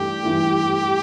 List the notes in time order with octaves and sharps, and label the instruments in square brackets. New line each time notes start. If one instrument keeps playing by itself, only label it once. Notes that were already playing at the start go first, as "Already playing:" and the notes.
Already playing: [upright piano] G2 E3 A3 [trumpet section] G4
[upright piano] G2 E3 A3